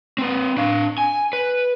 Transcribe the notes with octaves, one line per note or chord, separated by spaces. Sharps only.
C4 B4
D4 F5
G#5
B4